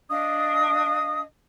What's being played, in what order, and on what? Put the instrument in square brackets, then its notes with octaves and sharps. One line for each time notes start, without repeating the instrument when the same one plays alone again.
[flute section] D4 D#5 F5 D#6